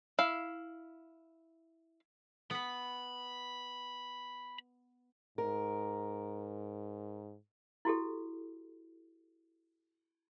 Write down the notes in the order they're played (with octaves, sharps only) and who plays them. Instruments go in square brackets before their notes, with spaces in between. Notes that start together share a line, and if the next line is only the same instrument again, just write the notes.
[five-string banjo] E4 F5
[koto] B3 B4 [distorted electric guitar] B5
[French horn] G#2 [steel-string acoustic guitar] A#4
[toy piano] E4 F#4 G4 A4